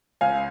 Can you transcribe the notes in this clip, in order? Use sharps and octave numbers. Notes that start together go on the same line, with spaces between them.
C#2 F5 G#5